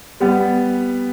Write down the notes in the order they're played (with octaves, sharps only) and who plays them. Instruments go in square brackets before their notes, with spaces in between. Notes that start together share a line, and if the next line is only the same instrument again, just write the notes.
[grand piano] G3 B3